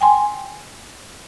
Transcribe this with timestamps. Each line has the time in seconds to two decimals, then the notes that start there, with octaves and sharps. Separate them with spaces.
0.01 G5 G#5 C6